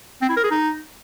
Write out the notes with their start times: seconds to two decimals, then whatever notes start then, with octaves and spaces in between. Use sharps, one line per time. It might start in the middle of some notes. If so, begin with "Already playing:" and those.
0.22 C4
0.29 E4
0.37 A#4
0.44 G#4
0.51 D#4